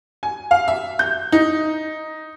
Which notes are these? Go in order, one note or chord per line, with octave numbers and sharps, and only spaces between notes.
G#5
F5
E5
G6
D#4